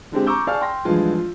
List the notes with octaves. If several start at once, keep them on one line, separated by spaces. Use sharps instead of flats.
D3 G#3 C4 G4
A#5 C#6 D6 E6 G6
D5 F5 G#5 A5 C#6 F6
G5 C6 A#6
G2 D3 E3 F3 G#3 F4
F4